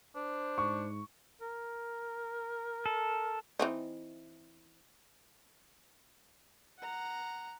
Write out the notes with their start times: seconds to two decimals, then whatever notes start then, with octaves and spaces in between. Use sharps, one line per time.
0.15 D4 C5
0.58 G#2 C#6
1.41 A#4
2.86 A4
3.59 E3 C4 D#4
6.80 F#5 A#5